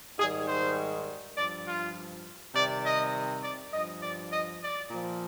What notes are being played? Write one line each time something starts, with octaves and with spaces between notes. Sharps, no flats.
G#2 D#3 G3 G#4
C5
G2 F3 D5
F4
C3 D#3 G3 D5
D#5
D5
G2 F3 D#5
D5
D#5
D5
A#2 F3